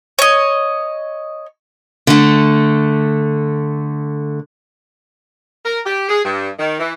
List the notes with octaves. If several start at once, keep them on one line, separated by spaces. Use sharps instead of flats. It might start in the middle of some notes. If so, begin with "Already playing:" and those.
C#5 D#5
D3 A3
A#4
G4
G#4
G2
D#3
E3